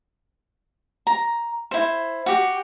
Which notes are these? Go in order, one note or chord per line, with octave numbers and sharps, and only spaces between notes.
A#5
E4 C5
F#4 G4